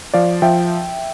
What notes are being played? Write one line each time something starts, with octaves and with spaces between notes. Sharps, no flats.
F3 D5 F5
F3 E5 G5